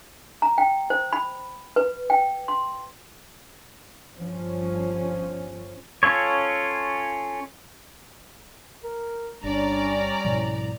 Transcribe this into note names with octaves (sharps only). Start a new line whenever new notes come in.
A#5
G5
C5
B5
B4
G5
C6
G1 F3 C#4
C#4 F4 A4 C#5
A#4
G1 G3 C#4 D4 D5 A#5
C2 G#2 B2 F3